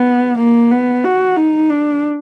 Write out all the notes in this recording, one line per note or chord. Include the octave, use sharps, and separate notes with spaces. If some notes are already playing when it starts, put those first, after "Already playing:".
Already playing: B3
A#3
B3
F#4
D#4
D4